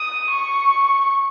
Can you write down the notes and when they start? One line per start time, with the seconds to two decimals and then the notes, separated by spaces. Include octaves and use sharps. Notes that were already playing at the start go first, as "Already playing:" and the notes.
Already playing: D#6
0.30 C#6